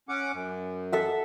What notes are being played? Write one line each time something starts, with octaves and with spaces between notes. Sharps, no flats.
C#4 F#5 D6
F#2
A4 E5 F#5